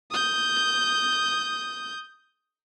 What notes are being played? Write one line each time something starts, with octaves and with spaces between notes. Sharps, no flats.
D#6 G6